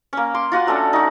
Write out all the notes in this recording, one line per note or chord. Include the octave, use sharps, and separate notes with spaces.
A#3 C#4
C6 D6
F4 F#4 F#5 G#5
F#3 A3 C#4 D4
D#4 F#4